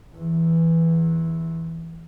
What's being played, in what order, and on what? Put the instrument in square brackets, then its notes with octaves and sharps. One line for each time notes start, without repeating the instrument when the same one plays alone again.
[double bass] E2 E3